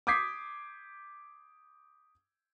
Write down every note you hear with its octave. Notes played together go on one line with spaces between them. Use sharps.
D6 D#6 G6 G#6 B6 C7